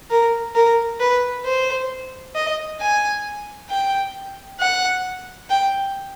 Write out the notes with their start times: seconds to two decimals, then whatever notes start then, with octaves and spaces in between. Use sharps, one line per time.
0.10 A#4
0.55 A#4
1.00 B4
1.45 C5
2.35 D#5
2.80 G#5
3.70 G5
4.60 F#5
5.50 G5